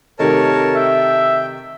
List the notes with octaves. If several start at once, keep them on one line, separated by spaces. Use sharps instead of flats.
C3 D#3 A3 A#4 C#5 A5
E5 G5